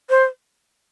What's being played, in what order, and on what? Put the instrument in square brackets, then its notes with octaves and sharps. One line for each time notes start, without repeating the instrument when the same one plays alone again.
[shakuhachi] C5